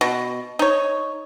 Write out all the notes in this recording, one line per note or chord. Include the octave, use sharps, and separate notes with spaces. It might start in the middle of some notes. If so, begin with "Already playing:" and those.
B2
D#4 C#5